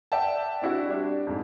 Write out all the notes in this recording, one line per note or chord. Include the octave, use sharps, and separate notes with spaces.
D5 E5 F#5 G5 A5
C4 D4 E4 F#4
G3 D4
F2 G#2